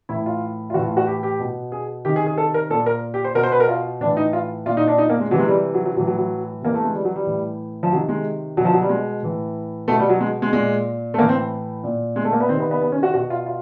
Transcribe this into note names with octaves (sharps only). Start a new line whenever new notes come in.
A2 E3 E4
F4
F4
A2 E3 F#4
F4
F#4
G4
G4
B2
G#4
C3 D#3 G4
G#4
G#4
A4
A#4
A#2 A4
A#4
G4
C5
B2 A#4
C5
B4
A#4
F4
A2 E3 D4
D#4
F4
A#2 F4
D#4
D4
D#4
A#3
G#3
C3 E3 F#3
G#3
G3
F#3
F#3
A2 E3 F#3
F#3
F#3
C3 E3 A#3
A3
G#3
G3
F#3
G3
A2 E3
F3
C3 D#3 F#3
G#3
B2 F#3
F3
F#3
G3
G#3
A2 E3
B2 A3
G3
F#3
G#3
G#3
A#2 G#3
A3
A2 E3 A#3
C4
A#2
G#3
A3
A#3
B3
C3 D#3 C4
B3
B3
B3
C#4
F#4
B2 F#4
F4
F4